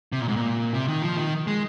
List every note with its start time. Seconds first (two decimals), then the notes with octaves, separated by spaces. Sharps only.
0.12 C3
0.20 A#2
0.28 G#2
0.36 A#2
0.73 C3
0.88 D#3
1.02 F3
1.17 D#3
1.47 G#3